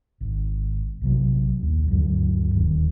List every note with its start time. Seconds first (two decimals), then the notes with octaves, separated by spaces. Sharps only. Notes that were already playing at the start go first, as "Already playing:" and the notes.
0.21 G#1
1.01 A#1 C3 F#3
1.63 D#2
1.88 D2 G2 F#3
2.54 D#1 D#3